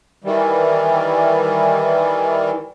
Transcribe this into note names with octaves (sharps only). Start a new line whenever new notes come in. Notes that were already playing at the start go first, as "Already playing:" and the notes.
D#3 E3 G3